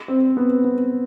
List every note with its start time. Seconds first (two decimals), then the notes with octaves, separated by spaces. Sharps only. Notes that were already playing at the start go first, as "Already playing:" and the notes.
0.08 C4
0.37 B3
0.64 B3